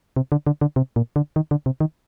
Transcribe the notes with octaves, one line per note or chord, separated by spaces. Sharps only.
C3
D3
D3
D3
C3
A#2
D3
D#3
D3
C3
D#3